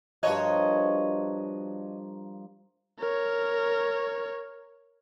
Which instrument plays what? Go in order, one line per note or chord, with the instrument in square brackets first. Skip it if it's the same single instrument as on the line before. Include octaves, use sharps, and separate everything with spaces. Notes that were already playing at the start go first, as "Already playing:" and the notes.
[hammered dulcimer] G2 F3 A#4 [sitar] F#4 C#5 D#5
[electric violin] A#4 C#5